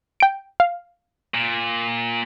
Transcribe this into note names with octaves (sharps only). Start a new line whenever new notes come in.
G5 D7
F5
A#2